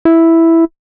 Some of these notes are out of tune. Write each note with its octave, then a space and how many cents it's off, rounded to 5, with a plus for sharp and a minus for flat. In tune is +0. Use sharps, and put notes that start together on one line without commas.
E4 +0